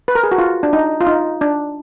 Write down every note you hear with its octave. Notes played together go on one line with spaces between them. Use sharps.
B4
A#4
G#4
F#4
F4
D4
D#4
F4
D#4
D4